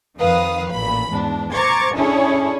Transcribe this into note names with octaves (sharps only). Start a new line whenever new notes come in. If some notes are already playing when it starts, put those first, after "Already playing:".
F2 D#3 F3 B4 F5 D#6
A1 A#2 B5
E2 G#2 D4
C5 A#5 C#6 D6 G#6 A6
C#4 D4 E4 G#4 A4 C#5